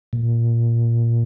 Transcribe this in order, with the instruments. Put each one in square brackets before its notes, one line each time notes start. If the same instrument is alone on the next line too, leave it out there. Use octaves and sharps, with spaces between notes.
[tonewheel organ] A#2